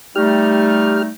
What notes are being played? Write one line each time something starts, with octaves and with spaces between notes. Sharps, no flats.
G3 A3 D#4 G4 F6